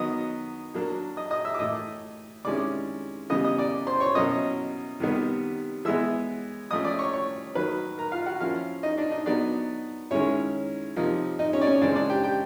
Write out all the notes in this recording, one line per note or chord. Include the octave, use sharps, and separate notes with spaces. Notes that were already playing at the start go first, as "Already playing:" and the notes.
Already playing: D#3 F#3 B3 D#5 D#6
F#3 A#3 D4
D#5 D#6
D#5 D#6
E5 E6
D6
A2 E3 A3 D#5 D#6
C3 D#3 G#3 C#4 E4 D5 D6
C#3 E3 G3 B3 D#5 D#6
D#5 D#6
D5 D6
C5 C6
C#5 C#6
B2 F#3 A#3 C#4 E4 D#5 D#6
C3 D#3 G3 B3
E3 G#3 B3 E5 E6
F3 A3 C#4 D#5 D#6
D5 D6
C#5 C#6
C#5 C#6
D#3 F#3 A#3 B4 B5
A#4 A#5
F4 F5
F#4 F#5
F3 A#3 C#4 E4 F4 F5
D#4 D#5
D4 D5
D#4 D#5
F#3 B3 D4 D#4 D5
D#3 G#3 C#4 E4 C#5
C3 F3 A#3 D#4
D#4 D#5
C#4 C#5
D5
C#4 C#5
C#3 E3 G#3 C4 D4 D5
D4 D5
G4 G5
G4 G5